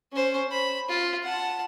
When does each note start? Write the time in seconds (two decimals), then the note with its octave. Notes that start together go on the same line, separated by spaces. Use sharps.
0.12 C#4 C5
0.51 B5
0.89 F4
1.23 F#5 A5